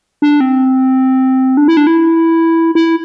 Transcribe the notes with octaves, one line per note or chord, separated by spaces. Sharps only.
D4
C4
D4
E4
D4
E4
E4